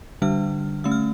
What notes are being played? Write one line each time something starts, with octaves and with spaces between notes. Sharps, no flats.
D3 G3 D4 F6
D3 A3 C#4 E6
F6